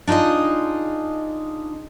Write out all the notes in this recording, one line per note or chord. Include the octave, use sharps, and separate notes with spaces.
D4 D#4 F4 G#4 D#5